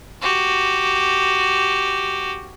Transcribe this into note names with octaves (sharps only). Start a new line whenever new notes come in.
F#4 G4